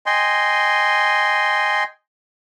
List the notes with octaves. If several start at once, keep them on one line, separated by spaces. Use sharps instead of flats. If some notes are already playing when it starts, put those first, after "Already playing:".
D#5 G5 G#5 C6